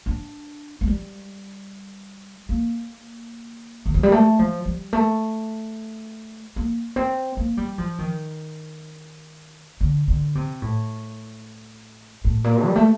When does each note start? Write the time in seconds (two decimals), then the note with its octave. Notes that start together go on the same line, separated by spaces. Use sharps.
0.06 D4
0.81 A3
0.88 G3
2.49 A#3
3.86 D#3
3.94 F3
4.03 G3
4.12 A3
4.39 F3
4.66 G3
4.93 A3
6.56 A#3
6.96 C4
7.37 A#3
7.57 G3
7.78 F3
7.99 D#3
9.81 D3
10.08 D3
10.35 C3
10.62 A2
12.24 A2
12.44 A#2
12.66 G3
12.76 A3